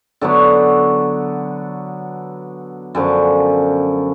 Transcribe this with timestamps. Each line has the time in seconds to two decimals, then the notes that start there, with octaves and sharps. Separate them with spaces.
0.21 D3 F#3 B3 F#4
2.95 F#2 D3 F3